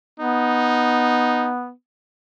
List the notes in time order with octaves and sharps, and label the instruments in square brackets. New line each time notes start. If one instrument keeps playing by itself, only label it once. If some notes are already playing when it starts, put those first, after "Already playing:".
[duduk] B3 [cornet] D#4